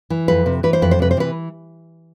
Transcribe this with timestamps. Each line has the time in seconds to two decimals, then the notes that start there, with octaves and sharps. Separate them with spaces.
0.10 E3
0.28 F2 B4
0.46 C3
0.63 E3 B4
0.73 C5
0.82 F2 B4
0.91 C5
0.99 C3 B4
1.11 C5
1.17 E3 B4